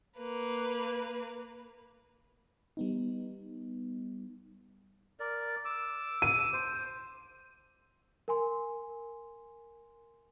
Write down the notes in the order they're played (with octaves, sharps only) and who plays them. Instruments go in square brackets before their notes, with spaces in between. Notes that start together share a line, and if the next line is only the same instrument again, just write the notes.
[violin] A#3 B4
[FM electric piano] G3 B3 D#4
[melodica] A#4 D5
D6 E6
[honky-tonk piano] D#7
[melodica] C5
[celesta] A#4 G#5 C6